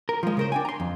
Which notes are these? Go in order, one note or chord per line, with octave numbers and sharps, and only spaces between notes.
A#4
F3 G#3
C#3 A#4 C5
D4 G5 G#5
A#5 C6
F2